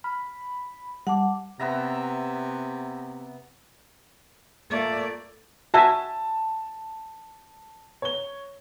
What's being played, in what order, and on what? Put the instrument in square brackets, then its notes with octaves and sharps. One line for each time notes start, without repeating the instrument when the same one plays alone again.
[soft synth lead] B5 [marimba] F6
[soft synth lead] G3 [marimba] F#5 A5 D6
[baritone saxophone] C3 [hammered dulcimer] B3 E5 A#5
[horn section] A#2 A3 [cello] A#3 D5
[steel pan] F#4 E5 G#5 [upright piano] A5
[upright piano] C#5 G7